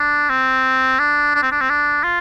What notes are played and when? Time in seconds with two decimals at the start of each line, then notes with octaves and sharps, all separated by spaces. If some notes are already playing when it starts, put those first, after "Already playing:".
Already playing: D4
0.30 C4
0.99 D4
1.35 D4
1.42 C4
1.51 D4
1.61 C4
1.70 D4
2.04 F4